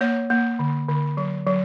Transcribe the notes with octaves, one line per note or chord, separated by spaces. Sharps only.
A#3 C#5
A#3
D3
D3
F#3
F#3